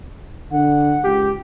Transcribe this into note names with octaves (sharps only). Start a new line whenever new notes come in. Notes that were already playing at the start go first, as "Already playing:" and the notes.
D3 F#5
C#2 G4